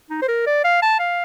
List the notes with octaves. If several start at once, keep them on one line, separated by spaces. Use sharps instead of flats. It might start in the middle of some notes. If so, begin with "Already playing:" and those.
D#4
C5
A#4
D5
F5
A5
F5